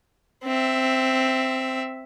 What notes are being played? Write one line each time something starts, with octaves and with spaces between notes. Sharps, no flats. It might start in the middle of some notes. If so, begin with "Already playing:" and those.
C4 E5